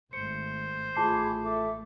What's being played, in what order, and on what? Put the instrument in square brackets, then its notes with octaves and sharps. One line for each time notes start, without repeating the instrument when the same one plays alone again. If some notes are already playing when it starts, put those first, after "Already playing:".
[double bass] G#1 A3 [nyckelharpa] C5 [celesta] C#7
[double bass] A1 A3 [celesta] F4 A5 C7 [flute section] G#4 B5 D6
[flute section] A4 E5 D6